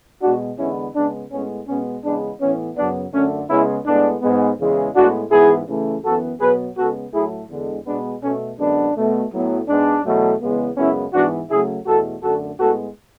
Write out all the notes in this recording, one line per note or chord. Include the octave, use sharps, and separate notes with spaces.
B2 G#3 B3 D4 F#4
E2 D3 G#3 B3 C#4 E4
C#3 G#3 B3 D4
A2 G#3 B3 C#4
B2 G#3 B3 C#4
E2 C#3 G#3 B3 D4
A2 E3 B3 C#4
F#2 C#3 F#3 B3 D4
F#2 D3 A3 C#4
C#3 G#3 B3 C#4 E4
A2 G#3 B3 D4
G#2 G#3 B3
E2 C#3 E3 G#3
A2 G#3 B3 D4 F#4
G#2 E3 B3 E4 G#4
C#3 E3 A3
F#2 E3 B3 F#4 A4
B2 F#3 B3 G#4 B4
C#3 G#3 B3 F#4 A4
A2 F#3 A3 E4 G#4
E2 D3 G#3
B2 G#3 B3 D4
B2 A3 C#4
F#2 D3 G#3 B3 D4
B2 A3
A2 F#3 B3
G#2 G#3 B3 D4
E2 B2 F#3 A3
E2 C#3 G#3 B3
F#2 C#3 G#3 B3 C#4 E4
G#2 E3 B3 D4 F#4
C#3 F#3 A3 E4 G#4
E2 B2 A3 F#4 A4
F#2 D3 A3 F#4 A4
A2 G#3 B3 F#4 A4